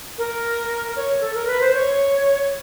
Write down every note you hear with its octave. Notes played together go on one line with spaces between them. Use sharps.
A#4
C#5
A4
A#4
B4
C5
C#5